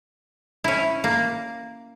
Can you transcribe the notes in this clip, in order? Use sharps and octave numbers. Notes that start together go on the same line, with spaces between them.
C#4 E4
A#3